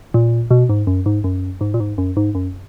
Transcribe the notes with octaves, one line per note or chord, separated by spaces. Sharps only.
A#2
B2
G#2
F#2
G#2
F#2
G#2
A#2
G#2
F#2
G#2
F#2